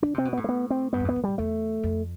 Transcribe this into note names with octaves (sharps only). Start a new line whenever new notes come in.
D3 D4
C3 C4
B2
A2 B3
A3
B3
C4
G2 B3
F2
E2 B3
F2
A2 G3
E2 A3
F2